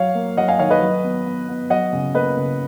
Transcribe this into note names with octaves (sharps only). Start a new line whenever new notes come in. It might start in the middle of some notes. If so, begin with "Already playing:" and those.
Already playing: F#3 C#5 F5
A#3
F#3 D#5 F#5
F5 G#5
D#3 C#5 F5
B4 D#5
F#3
B3
B3
B3
F#3 D#5 F#5
C#3
A#3 B4 D#5
C#3